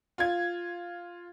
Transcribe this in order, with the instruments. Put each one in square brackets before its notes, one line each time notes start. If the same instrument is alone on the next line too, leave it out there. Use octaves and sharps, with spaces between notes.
[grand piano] F4 G#6